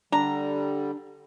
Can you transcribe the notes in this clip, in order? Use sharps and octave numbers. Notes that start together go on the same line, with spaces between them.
D3 G3 D4 A#5